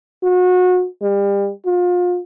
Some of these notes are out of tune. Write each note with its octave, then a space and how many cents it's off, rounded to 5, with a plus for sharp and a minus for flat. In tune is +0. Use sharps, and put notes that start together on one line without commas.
F#4 -30
G3 +30
F4 +35